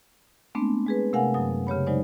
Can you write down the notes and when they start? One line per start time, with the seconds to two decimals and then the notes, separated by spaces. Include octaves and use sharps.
0.55 G#3 A3 B3 C4 D4
0.86 G#3 G#4 B4
1.13 C3 A3 A#4 F5 F#5 G#5
1.34 F#2 F#3 D#6
1.67 C#3 G4 C#5 B5
1.86 F#3 G#3 D#4 C5 D5